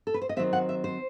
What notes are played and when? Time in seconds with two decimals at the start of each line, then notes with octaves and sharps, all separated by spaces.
0.07 A4
0.14 B4
0.22 C5
0.29 D#5
0.36 D#3 F#3 C4 E5
0.53 F#5
0.69 E5
0.84 C5